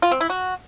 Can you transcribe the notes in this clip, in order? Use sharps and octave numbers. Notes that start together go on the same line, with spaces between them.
F4
C4
E4
F#4